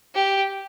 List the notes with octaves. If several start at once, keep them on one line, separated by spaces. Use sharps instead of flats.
G4